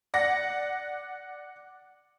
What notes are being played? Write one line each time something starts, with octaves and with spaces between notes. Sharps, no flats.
D5 F#5 A#6